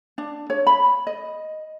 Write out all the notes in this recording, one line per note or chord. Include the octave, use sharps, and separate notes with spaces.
D4
C#5
B5
D#5